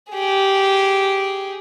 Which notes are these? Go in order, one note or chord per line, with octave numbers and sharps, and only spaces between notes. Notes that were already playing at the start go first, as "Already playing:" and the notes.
G4 G#4